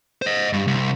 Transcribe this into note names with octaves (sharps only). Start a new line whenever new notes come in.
C5 D#5
G2
C2